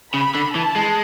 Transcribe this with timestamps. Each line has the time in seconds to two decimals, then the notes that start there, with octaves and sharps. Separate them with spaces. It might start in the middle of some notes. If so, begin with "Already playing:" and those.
0.14 C#3 B5
0.35 D3
0.55 E3 A5
0.76 G#3